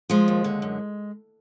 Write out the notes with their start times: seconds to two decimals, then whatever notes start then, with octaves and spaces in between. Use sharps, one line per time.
0.10 F3 G#3
0.28 D#2
0.44 D3
0.62 F#2